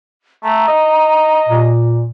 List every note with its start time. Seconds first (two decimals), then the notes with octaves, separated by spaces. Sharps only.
0.44 A3 A#5
0.67 D#5
1.48 A#2